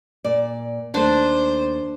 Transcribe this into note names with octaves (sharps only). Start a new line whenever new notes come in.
A#2 D5
D#2 A3 D4 C5